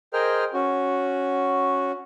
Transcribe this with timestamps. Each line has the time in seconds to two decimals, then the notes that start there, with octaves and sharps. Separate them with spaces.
0.13 G#4 A#4 C5 D#5 G5 F6
0.54 C#4 F#4